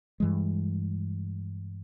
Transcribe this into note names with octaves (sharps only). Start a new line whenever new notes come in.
G2 E3 G#3